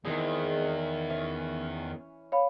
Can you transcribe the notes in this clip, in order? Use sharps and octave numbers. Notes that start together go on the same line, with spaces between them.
E2 D#3 G#3 C4 G#4
E3 C#4
C#5 F5 B5